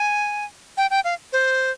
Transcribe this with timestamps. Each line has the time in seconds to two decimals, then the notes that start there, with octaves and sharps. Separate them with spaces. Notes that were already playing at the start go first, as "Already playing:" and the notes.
Already playing: G#5
0.77 G5
0.91 G5
1.05 F5
1.33 C5